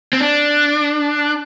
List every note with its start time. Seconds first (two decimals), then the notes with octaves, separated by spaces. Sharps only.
0.13 C4
0.20 D4